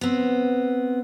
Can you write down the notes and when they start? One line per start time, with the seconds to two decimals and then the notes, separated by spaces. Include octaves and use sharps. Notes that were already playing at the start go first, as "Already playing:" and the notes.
0.01 B3 C4